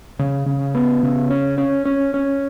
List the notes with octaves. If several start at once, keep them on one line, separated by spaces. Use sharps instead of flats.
C#3
C#3
B3
C#3
C#4
C#4
C#4
C#4